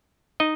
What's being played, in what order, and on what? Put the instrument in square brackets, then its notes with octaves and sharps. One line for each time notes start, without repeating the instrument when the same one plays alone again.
[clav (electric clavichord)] D#4 D#5